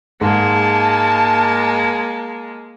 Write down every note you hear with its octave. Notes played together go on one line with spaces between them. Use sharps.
G#2 G#3 A#3 A5